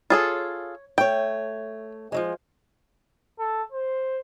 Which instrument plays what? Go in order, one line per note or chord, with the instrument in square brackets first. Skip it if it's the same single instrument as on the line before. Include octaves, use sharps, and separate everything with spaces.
[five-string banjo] F4 G#4 A4 [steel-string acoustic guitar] C#5
[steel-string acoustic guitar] A3 C#5 [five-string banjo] G5
[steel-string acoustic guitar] F3 F#3 G#3
[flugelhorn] A4
C5